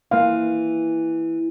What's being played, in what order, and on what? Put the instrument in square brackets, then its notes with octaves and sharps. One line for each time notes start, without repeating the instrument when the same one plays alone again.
[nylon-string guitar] E3 [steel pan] A#3 F5